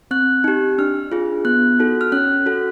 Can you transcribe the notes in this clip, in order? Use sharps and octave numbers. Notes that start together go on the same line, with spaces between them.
C4 F#6
D#4 G4
D4 F6
F4 G#4
B3 F#6
D#4 F#4 A4
F6
C#4 F#6
F#4 A4